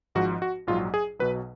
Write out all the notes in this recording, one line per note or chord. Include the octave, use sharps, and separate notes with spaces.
G#1 G#2 F3 F#4
F#4
A#1 G#2 F#3 F4
G#4
B1 B2 F#3 B4